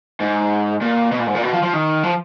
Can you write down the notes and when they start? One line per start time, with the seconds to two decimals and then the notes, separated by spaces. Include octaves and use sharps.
0.20 G#2
0.82 A#2
1.12 B2
1.19 A#2
1.27 G#2
1.34 A#2
1.42 B2
1.52 F3
1.62 F3
1.73 D#3
2.03 F3